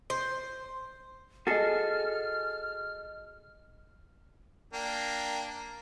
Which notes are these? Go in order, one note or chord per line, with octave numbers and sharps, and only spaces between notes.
C5
F#4 G#4 A4 D#5 F6 A6
A#3 D4 G5